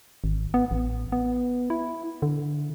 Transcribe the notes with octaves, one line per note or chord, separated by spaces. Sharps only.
G#1
B3
A1
B3
E4
D3